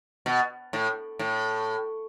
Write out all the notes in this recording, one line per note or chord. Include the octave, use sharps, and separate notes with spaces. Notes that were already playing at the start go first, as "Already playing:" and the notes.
B2
A2
A2